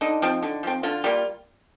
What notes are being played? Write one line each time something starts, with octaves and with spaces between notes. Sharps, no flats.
D3 D#4
F3 C4
D3
F3 C4
D3 F4
G3 A#3 F4